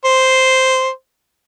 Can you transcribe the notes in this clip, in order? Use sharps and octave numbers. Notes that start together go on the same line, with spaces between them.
C5